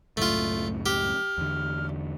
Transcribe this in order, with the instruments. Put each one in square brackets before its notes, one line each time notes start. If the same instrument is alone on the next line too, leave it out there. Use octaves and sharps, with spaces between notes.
[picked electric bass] C#2 F#2 A2 [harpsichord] A3 F4
[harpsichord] G4 [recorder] F6
[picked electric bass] E2 D3